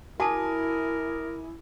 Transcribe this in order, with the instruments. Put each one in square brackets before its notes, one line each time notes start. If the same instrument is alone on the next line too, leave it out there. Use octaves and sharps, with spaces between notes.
[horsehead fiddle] E4 [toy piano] F#4 A5 [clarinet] A#4 [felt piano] G#5 D6 D#6